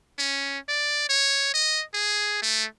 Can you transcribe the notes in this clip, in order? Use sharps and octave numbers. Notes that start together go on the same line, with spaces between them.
C#4
D5
C#5
D#5
G#4
A3